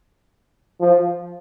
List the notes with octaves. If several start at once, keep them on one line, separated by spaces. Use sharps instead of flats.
F3